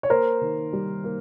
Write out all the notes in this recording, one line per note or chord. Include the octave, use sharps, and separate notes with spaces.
C#5
A#3 A#4 C5
D#3
G3
A#3